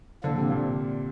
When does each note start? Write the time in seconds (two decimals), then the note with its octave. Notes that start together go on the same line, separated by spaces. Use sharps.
0.24 A2 D3 F3 A#3 D4 A4
0.38 C3
0.51 A#2 D3